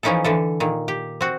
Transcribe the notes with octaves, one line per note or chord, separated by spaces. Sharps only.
E3 F3 C#4 D#4 E4 A4
D3 E3 A4
A#2 D#3
G4
C4 F#4